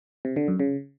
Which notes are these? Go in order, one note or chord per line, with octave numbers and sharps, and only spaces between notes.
C3
D3
F#2
C#3